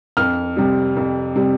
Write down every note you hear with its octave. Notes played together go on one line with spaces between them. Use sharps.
F2 F6
C3 G3
F2
C3 G3